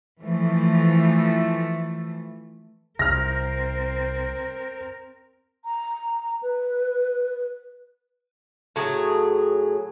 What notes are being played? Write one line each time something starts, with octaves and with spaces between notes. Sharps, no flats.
E3 F3 A3
C2 C4 A#4 F6 A#6
A#5
B4
A2 F#3 G#4